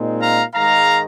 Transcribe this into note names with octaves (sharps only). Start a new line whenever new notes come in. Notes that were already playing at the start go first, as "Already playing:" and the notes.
Already playing: A#2 G#3 C4 D#4
F5 A#5
G#2 D#3 G#3 F5 A#5